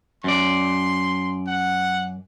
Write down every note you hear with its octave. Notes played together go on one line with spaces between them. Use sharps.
F#2 D5 C6
F#5